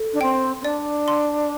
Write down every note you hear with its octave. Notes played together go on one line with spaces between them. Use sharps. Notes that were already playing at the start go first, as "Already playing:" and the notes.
Already playing: A4
D4
C4 G5
C4
D4 D5
C6